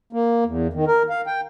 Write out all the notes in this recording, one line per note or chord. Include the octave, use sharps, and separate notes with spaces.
A#3
E2
D#3
A#4
F5
G5